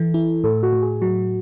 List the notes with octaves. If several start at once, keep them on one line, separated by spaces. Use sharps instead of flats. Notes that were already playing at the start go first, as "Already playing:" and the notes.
Already playing: E3 E4 A4
E4
A2 A4
F#4
A2
G#4
F#3 F#4